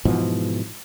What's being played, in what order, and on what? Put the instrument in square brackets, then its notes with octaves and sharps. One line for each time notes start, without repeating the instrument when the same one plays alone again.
[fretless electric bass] G#2 B2 E3 F3